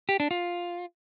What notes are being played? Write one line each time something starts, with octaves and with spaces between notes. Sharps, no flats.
G4
D4
F4